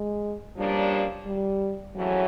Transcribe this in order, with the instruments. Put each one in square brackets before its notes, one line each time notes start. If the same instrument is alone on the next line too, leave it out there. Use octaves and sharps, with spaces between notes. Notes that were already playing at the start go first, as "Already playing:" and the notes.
Already playing: [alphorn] G#3
[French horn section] C#3 F3 A#3 D4 [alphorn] G3
[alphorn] G3
[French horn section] F2 C#3 E3 A3 C#4 [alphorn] F#3